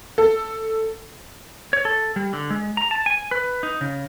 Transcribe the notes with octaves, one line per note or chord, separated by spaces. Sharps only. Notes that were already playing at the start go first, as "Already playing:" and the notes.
A4
C#5
A4
G3
D3
G#3
A#5
A5
G#5
B4
D#4
C#3